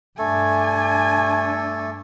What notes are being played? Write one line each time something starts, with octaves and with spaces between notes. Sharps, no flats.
G2 A3 D4 A4 G#5